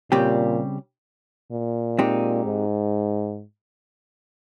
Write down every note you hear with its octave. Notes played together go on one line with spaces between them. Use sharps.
A#2 C#3 G3 C4 G4
A#2
G#3 C4 D#4 G4
G#2